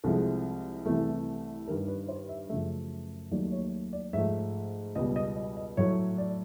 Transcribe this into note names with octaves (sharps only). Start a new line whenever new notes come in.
C2 C3 F3 G#3 A4
C2 C3 E3 A3
G2 D#3 G3 A#4
B4
C5
E5
F#2 C#3 F3 A3 E5
D#2 D#3 F#3 A3 D5
C#5
D5
G#2 F3 A3 E5
C#2 B2 G3 D#5
D#5
D#5
D#5
A2 F#3 A3 C#5
D5